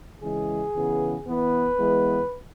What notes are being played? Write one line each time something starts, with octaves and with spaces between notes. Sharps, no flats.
C#3 E3 G#3 G#4
C#3 E3 B3
E3 B3 B4
E3 G#3 B3